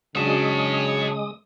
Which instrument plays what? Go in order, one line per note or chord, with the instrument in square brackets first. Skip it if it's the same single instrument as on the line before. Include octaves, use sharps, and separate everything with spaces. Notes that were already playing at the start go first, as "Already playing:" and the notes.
[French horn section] C#3 [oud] F#3 D4 F#4 [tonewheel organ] G#3 D#6 [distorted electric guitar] C#5 A5